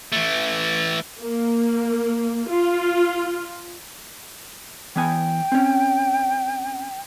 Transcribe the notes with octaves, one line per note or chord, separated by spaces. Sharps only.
E3 A3
A#3
F4
E3 B3 G5 G#5
C4 C#4